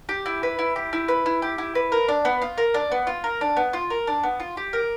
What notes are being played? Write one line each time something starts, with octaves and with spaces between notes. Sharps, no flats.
G4
E4
B4
E4
G4
E4
B4
E4
G4
E4
B4
A#4
D4
B3
F4
A#4
D4
B3
F4
A#4
D4
B3
F4
A#4
D4
B3
F4
G4
A#4